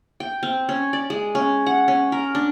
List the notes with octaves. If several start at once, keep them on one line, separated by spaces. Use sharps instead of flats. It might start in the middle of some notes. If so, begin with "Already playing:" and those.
G5
C4
C#4
D5
G#3
C#4
F#5
C#4
A#4
D4